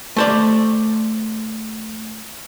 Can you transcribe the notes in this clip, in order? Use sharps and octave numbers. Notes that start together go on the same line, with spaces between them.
A3 C5 D5